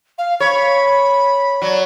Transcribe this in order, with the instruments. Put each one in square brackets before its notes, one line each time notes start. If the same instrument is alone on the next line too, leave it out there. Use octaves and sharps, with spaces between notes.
[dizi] F5
[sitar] C#5 [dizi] B5
[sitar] F#3 [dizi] D5